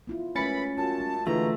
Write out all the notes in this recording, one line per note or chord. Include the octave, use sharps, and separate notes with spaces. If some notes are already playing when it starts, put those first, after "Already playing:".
B3 E4 F4
F#2 E3 G#3 A3 C#4 B5 A6 C#7
F#2 F4 F#4 A5
G#3
B2 D3 E3 G#3 A3 E4 F4 A#5